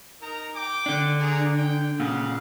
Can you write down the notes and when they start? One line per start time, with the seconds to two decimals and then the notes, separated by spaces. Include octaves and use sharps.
0.21 D#4 A#4 A#5
0.55 G5 D6
0.86 D3 D4
1.20 G#4 D5 A#5
1.57 G5
2.00 A#2 C#3 F5 F#5